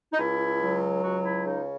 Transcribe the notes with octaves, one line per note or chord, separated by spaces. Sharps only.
D#4
C#2 E4
F#3
C#2 F#4
E4
C#3 D#4